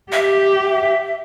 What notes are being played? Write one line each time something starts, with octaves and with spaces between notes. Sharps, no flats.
G4 E5